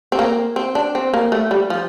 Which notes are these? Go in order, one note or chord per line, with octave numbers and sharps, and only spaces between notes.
C4
A#3
C4
D4
C4
A#3
A3
G3
F3